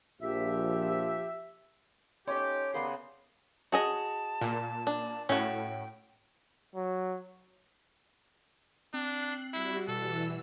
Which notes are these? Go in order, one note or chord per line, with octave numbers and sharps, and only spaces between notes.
A#1 F3 G4 E5
C#4 D#4 F4 G4 A4 C#5
D#2 C#3 B3 A#4 D5 C6
F#4 G#4 D#5 A5
A#2
D4
A2 C#4 F#4 G5
F#3
C4 D4 F#6 C7
G3 E4 F#4
B2 E3 A4 E6